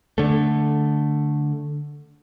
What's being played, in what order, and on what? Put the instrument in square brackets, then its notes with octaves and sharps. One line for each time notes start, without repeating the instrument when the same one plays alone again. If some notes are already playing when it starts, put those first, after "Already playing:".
[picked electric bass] D3 A3